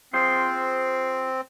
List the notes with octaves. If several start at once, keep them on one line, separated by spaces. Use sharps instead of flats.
C4 F4 G#4 C5